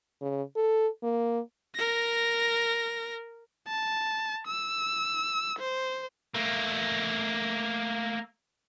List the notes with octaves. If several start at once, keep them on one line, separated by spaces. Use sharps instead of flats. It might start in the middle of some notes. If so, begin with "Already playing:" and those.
C#3
A4
A#3
A#4 A#6
A5
E6
C5
A3 A#3